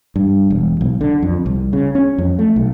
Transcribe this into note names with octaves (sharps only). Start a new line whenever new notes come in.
G2
E1
B1
D3
F2
C2
C#3
C#4
F2
A3
B1